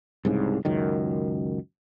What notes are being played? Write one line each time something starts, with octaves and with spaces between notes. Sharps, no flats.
C2 G#2 C#3
C#2 F#2 D#3